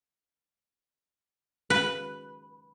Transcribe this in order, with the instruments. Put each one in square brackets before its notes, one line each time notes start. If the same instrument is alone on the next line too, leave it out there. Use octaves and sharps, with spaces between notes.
[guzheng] B4